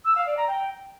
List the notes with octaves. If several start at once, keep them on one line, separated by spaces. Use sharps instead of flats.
E6
F5
D5
A#5
G5